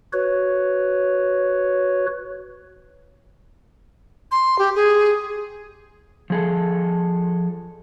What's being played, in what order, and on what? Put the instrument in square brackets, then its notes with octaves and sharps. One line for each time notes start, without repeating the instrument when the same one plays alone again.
[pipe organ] F#4 B4 C#5
[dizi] C6
G4
G#4
[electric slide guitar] F3 G#4 A4